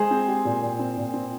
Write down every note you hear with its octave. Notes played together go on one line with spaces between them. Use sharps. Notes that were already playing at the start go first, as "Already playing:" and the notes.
Already playing: G#3 G#4 C5
C4
G4
A#2
A#2
C4
A#2
C4